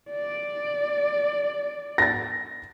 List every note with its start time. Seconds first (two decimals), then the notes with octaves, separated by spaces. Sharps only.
0.11 D5
1.98 A6 A#6